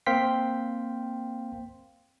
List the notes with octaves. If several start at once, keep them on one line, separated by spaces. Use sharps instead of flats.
A#3 C4 F5 G5 C6 B6